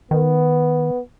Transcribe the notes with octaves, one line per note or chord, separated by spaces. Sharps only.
D#3 B3